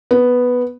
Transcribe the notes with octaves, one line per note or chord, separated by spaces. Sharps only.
B3